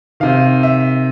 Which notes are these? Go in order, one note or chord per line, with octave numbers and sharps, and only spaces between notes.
C3 D#3 F5
E5